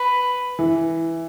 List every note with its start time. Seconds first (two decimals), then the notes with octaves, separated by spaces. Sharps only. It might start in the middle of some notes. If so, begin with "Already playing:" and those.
Already playing: B4
0.59 E3